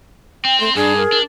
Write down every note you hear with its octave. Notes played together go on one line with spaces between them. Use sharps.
C4 G5
A3 C6
G2 D4 G#4
A#4
D4